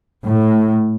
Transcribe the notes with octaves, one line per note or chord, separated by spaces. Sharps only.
A2